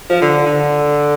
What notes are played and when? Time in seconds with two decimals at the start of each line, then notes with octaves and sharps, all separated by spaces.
0.10 F3
0.22 D3
0.46 D3